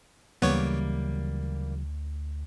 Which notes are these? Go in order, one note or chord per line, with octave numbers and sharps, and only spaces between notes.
D2 C#3 E3 F#3 G3 A#3 B3 C#5